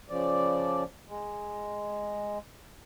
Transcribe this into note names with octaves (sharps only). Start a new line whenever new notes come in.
C#3 F3 D5
G#3